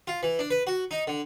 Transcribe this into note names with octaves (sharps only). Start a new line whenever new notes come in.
F4
E3
D4
B4
F#4
D#4
D3